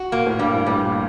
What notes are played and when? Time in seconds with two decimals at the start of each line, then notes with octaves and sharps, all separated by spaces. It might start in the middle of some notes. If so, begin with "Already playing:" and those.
Already playing: F#4
0.12 A#2 A#3
0.27 A2
0.39 G2 G3
0.53 A2
0.66 A2 G3
0.85 A#2